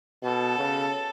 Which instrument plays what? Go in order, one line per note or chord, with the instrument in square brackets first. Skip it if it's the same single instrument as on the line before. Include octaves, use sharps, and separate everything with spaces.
[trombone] B2 [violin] A4
[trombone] C#3